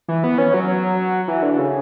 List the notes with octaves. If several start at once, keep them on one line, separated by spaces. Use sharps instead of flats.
E3
B3
C#4
F#3
E3
D3
C#3